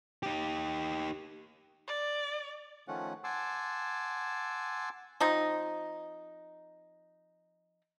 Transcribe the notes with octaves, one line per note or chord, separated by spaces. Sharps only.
D#4 G4
D5
D#3 F3 A3 C#4 F#5
F#5 G#5 A5 C6 D6 E6
F3 C4 D#4